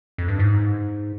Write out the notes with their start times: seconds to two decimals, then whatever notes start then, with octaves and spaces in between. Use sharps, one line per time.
0.18 F2
0.28 G2
0.39 G#2